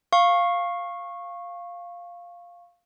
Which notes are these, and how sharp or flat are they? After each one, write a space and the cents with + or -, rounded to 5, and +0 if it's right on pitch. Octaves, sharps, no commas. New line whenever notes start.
F5 +0 C#6 -15